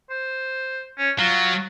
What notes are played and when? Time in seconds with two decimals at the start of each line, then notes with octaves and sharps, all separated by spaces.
0.10 C5
0.98 C#4
1.19 F#3 F4